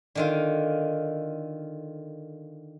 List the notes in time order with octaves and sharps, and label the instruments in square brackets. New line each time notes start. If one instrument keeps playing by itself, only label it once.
[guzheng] D3 D#3 F4